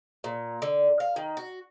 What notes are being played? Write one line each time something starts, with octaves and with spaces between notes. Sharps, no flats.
A#2
D3
F5
D#3
F#4